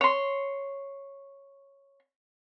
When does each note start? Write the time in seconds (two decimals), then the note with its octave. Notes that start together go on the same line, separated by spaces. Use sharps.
0.01 C#5 C6